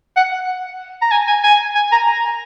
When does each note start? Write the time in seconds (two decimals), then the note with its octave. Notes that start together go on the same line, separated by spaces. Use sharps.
0.17 F#5
1.02 A#5
1.11 G#5
1.28 G#5
1.43 G#5
1.75 G#5
1.92 A#5
2.07 A#5